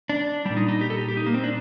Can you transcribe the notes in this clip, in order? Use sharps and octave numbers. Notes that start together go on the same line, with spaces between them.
D4
A#2 G3 D4
D#4
D#4
G4
A4
G4
G4
D#4
A#3
C4
D4